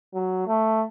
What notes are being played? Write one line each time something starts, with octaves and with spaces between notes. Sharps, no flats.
F#3
A3